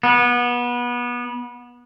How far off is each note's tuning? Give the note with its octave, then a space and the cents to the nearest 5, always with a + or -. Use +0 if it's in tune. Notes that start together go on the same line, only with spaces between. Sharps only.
B3 -25